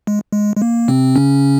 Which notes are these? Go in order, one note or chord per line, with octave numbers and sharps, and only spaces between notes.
G#3
G#3
G#3
A#3
C3 C4
C#3 C#4